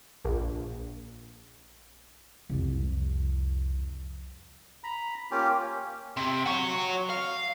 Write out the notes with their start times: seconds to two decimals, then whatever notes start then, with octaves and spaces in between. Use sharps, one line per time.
0.25 A#1
2.50 C2 F2
4.84 A#5 B5
5.31 A#3 C#4 F4 G4
6.17 C3
6.46 F#4 C#5
7.10 F5